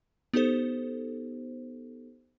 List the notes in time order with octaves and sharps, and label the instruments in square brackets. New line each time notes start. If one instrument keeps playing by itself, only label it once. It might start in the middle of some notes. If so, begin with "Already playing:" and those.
[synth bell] B3 D#4 G4 A4 C5